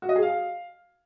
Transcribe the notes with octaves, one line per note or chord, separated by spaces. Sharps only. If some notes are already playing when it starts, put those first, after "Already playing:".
F#4
D#5
G#4
F5